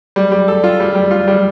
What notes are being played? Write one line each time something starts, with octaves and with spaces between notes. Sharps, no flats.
G3
G3
A4
F4
G3
G3
F4
G3